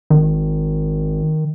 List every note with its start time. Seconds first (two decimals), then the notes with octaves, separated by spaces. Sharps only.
0.10 G#1 D#3